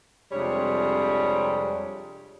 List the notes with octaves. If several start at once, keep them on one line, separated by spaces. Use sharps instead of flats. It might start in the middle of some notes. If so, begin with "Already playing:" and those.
F2 C3 G3 G#3 D4 C#5